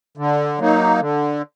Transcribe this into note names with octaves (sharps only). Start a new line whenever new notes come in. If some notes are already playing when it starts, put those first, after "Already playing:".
D3
F#3 A#3 D#4
D3